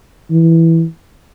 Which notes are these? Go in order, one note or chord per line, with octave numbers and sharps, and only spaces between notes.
E3